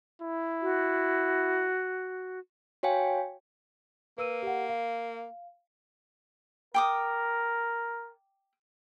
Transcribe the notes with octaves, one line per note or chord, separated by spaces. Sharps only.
E4
F#4
F#4 C#5 F5 G5 G#5
A#3 B4 E6 D#7
G4 F#5
F5
A#4 G5 D6 D#6